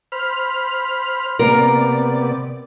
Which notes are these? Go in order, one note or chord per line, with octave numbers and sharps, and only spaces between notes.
C5 B5 F6
C3 A#3 B3 A#4 D5